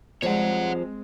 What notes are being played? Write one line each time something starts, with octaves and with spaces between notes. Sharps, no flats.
F2 F3 G3 G#3 C4 C#5 F#5